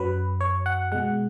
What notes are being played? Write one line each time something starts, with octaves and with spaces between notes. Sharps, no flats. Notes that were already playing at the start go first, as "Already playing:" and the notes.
Already playing: F#2 F#3 B4
C#5
F#5
B2 G#3 F#5